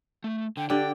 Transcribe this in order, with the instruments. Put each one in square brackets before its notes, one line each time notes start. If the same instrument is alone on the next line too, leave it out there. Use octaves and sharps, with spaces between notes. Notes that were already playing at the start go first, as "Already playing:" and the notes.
[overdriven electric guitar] A3
[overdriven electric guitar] D3 [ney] G5
[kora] D3 G4 D5 [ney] D4 [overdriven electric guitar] G5